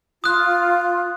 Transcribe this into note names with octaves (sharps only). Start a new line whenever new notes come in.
F4 D#6 F#6